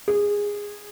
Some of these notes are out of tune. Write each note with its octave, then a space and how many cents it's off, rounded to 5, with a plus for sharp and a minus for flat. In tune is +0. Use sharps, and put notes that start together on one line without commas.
G#4 -15